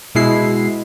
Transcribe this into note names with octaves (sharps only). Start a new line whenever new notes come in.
B2 G#3 E4 C7